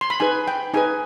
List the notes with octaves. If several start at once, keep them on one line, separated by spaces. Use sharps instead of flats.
C6
B5
D#4 G#4 B4 G#5
G5
D#4 G#4 B4 G#5